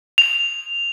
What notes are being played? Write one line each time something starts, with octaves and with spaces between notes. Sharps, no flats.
F7